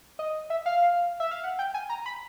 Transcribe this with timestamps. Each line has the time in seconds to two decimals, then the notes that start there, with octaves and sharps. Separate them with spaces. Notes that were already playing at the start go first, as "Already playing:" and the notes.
0.19 D#5
0.50 E5
0.66 F5
1.20 E5
1.31 F5
1.44 F#5
1.59 G5
1.74 G#5
1.89 A#5
2.06 B5